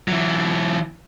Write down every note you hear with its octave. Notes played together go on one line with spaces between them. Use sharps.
E3 F#3